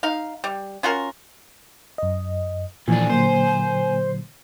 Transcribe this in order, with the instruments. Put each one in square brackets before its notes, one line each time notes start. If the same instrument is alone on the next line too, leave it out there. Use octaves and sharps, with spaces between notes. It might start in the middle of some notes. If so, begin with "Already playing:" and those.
[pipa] D#4 F5
G3
C#4 F4 F#4 A#4
[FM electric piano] F#2 D#5
[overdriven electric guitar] D#2 D4 [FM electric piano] A#2 E3 F3 [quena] G#5
[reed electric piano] A#2 D3 F#3 [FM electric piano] A#3 [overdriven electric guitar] C5